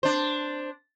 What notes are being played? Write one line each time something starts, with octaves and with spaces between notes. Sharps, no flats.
D4 C5